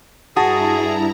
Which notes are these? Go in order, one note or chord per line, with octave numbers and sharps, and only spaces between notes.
G2 E4 F#4 G#4 A5 A#5 D#6